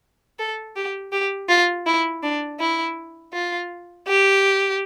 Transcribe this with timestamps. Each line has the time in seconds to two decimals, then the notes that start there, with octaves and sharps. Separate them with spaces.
0.39 A4
0.76 G4
1.12 G4
1.49 F4
1.86 E4
2.23 D4
2.60 E4
3.33 F4
4.07 G4